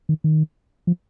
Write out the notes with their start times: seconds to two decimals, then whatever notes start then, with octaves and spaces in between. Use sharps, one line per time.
0.09 D#3
0.24 D#3
0.87 F3